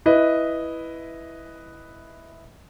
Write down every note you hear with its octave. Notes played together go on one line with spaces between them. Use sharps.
E4 B4 D#5